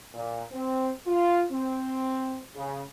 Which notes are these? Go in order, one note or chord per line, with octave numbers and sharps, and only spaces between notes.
A#2
C4
F4
C4
C#3